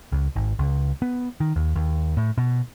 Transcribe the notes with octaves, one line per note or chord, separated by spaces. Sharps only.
C#2
G#1
C#2
B3
D#3
D#2
D#2
A2
B2